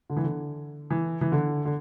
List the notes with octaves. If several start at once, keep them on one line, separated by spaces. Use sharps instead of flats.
D3
E3
D3
E3
E3
D3
D3